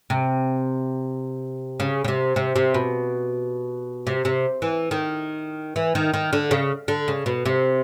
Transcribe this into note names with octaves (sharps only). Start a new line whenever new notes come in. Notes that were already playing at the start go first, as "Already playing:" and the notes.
C3
C#3
C#3
C3
C3
C3
B2
C3
C3
E3
D#3
E3
D#3
D#3
D3
C#3
D3
C#3
B2
C3